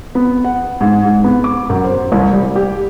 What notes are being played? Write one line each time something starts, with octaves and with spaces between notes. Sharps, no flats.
B3
F#5
G#2
G#2
B3
D6
F#2
C5
C2
G3
G4